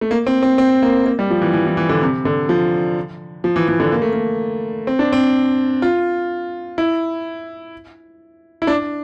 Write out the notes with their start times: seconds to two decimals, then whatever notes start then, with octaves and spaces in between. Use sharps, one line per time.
0.01 A3
0.11 A#3
0.27 C4
0.43 C4
0.58 C4
0.82 A#3
1.06 A#3
1.19 G3
1.31 F3
1.42 E3
1.53 E3
1.66 E3
1.77 E3
1.89 D3
2.02 C3
2.25 D3
2.49 F3
3.44 F3
3.56 E3
3.68 E3
3.80 D3
3.92 A#3
4.02 A3
4.13 A#3
4.87 C4
4.99 D4
5.13 C4
5.82 F4
6.78 E4
8.62 E4
8.67 D4